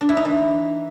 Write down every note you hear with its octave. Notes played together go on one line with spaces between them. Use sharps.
D4
E4
D#4
E3